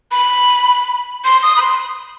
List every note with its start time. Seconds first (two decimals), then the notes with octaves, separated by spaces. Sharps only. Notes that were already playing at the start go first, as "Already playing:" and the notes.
0.11 B5
1.24 C6
1.43 D#6
1.57 B5
1.62 C6